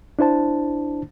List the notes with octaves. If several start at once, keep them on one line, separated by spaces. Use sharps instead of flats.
D4 E4 C5 A5